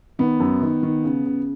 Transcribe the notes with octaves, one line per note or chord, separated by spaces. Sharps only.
D#3 B3
F#2
D#3
D#3
C#3
C#3